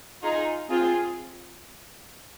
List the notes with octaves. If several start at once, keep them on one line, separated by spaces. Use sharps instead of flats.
D#4 F4 G#4
C4 F4 G#4